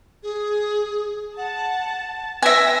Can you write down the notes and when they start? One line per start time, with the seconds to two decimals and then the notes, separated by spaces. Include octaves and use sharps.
0.23 G#4
1.37 F#5 A5
2.42 B4 E5 G#5 E6 A#6 B6